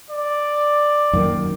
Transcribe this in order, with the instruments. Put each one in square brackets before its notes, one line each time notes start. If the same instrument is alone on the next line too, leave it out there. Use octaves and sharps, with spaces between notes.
[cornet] D5
[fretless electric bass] F#2 D#3 A#3